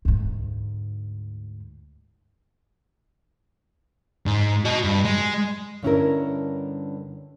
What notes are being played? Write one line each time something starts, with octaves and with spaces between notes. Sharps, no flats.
D2 G#2
G#2
F#4 D#5
G2
G#3
G2 D3 C#4 D4 E4 A#4